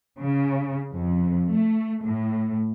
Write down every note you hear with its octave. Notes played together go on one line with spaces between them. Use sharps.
C#3
F2
A3
A2